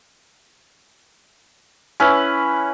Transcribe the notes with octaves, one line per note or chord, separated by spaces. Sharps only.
C#4 E4 B4